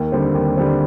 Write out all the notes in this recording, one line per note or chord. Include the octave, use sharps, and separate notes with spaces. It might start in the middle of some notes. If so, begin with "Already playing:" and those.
Already playing: D#2
D3 G3 C4
D#2
D3 G3 C4